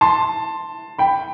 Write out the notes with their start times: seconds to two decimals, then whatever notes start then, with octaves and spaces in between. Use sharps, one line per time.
0.01 A5 C6
0.98 G5 B5